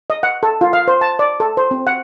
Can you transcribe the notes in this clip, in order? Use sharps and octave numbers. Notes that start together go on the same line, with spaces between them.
D#5
F#5
A4
F4
F5
C5
A5
D5
A4
C5
C4
F#5